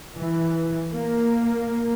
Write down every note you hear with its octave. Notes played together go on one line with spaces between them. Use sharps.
E3
A#3